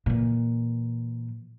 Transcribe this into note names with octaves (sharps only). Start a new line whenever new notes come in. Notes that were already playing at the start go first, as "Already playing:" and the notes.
A#2 E3